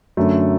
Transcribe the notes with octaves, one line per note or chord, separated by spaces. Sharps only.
F#2 D3 F#3 A3